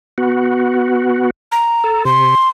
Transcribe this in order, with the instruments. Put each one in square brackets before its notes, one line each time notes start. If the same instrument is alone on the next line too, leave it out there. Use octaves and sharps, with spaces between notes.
[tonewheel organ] B3 F#4
[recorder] A#5
[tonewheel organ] A4
[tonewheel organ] C3 [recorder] C6